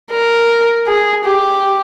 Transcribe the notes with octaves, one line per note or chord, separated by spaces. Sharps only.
A#4
G#4
G4